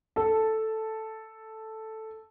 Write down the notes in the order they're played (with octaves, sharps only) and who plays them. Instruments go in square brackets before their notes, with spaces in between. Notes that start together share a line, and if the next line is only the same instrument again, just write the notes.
[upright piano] A4 A5